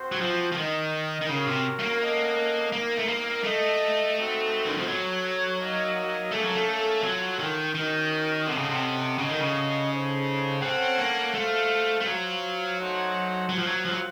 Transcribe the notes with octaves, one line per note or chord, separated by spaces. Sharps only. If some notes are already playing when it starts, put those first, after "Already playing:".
Already playing: C4 F#4 C5
F#3
F3
F3
D#3 D#4 A#4 D#5
D#3
C#3 C#4 F#4 A#4
C3
A3
A#3
C#4 A4 D#5 F#5
A#3 C4 D#4 A#4
A3
A#3
A3 F#4 A4 D#5
C4 D#4 F#4
D#3
F3
F#3 C#4 A4 C#5
A#3 D#4 A#4 D#5
A3 A#3 C#4 A4
F#3
A3
F#3 F4 A4 C#5 F#5
D#3
D#3 C#4 F#4 A#4 D#5
C3 C#4 A4 D#5 F#5
C#3
C3
C#3 F#4 A4 D#5
D#3
C#3
D#4 A4 C5
C4 C#4 A4 C#5 F#5
A#3
A3 F#4 C5 F5
A3
F#3 F4 C5 F5
A3 D#4 F#4 C5 F#5
F#3 A#3 F4 C5 F#5
F3
F#3
F3
F#3